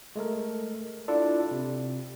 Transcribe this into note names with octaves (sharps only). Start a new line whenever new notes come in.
G#3 A3 A4 A#4
D4 E4 F4 A4 D5
C3